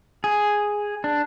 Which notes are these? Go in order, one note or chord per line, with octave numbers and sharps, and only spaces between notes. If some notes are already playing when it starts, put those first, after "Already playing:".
G#4
D4